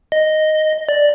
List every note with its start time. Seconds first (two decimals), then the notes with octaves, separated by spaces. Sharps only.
0.12 D#5
0.89 D5